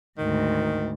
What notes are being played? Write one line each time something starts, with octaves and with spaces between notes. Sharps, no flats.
D2 G#2 D#3